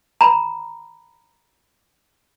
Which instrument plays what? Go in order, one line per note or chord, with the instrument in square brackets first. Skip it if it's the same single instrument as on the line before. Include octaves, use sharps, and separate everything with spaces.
[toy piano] A#5 B5